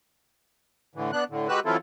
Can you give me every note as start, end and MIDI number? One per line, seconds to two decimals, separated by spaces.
0.95 1.11 45
0.95 1.11 50
0.95 1.11 52
1.13 1.24 59
1.13 1.24 62
1.13 1.24 90
1.30 1.48 45
1.30 1.48 50
1.49 1.60 56
1.49 1.60 66
1.49 1.60 67
1.49 1.60 71
1.49 1.60 88
1.49 1.60 90
1.66 1.77 52
1.66 1.77 54
1.66 1.77 60
1.66 1.77 64
1.66 1.77 65
1.66 1.77 69